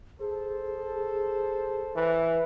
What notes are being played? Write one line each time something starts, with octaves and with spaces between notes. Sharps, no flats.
G#4 A4 C5
E3 B4